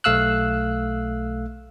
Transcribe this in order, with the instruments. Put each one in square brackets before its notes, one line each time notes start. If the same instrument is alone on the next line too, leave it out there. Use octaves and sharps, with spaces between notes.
[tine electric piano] B1 A3 F5 E6 F#6